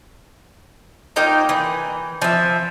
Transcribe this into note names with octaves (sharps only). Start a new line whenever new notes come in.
A#3 D#4 F4 G5
E3
F3 E5